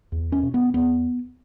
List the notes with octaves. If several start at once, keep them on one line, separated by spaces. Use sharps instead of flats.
E2
C#4
B2
B3
E2 B3